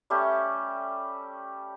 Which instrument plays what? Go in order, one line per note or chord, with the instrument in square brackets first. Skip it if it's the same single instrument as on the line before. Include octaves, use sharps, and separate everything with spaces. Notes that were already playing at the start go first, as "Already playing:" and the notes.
[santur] G3 A3 C#4 G4